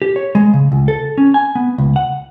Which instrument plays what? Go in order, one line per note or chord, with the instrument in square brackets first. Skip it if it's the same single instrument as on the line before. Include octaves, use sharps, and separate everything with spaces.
[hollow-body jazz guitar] G4
C#5
G#3
C#3
C#2
A4
C#4
G#5
B3
C#2
F#5